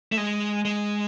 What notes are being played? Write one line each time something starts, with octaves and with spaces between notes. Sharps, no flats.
A3
G#3
G#3